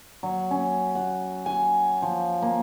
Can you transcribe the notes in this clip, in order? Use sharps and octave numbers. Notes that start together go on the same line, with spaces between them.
F#3
C#4
F#5
G#5
F3
A#3